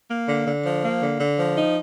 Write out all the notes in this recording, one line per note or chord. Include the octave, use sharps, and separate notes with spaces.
A#3
D3
D3
F3
A#3
D3
D3
F3
D#4